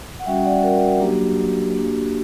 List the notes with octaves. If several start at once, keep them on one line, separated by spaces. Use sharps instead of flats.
F#5
G3 C#4 F#4 E5 G5
D5 F#5
F#4 A#4
F#4
F#3 A#3 D4 F#4 G4
A#3 D4 F#4